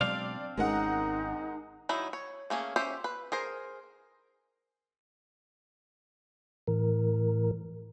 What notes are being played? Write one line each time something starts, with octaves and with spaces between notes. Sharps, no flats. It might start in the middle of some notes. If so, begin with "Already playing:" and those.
B2 F#3 G#3 C4 D4 D5 F5
G#1 G#3 C#4 D#4 A#4 F#5
D#3 F#3 D#4 E4
C#5
A3 A#3 C#4 G#4
C#4 G4 C5 E5
B4
G#4 A#4 C5
A2 E3 A#4